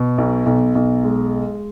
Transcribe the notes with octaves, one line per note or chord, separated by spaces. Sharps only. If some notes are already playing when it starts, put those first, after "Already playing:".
Already playing: B2
B1
B1
B1
G#3